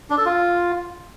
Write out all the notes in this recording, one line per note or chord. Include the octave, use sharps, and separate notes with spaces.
D4
A4
F4